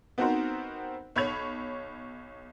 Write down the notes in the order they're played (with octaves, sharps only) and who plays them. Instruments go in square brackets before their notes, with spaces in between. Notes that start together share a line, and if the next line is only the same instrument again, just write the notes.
[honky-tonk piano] B3 C4 D#4 F#4 A#4 C5
B1 C#5 B5 G#6 F7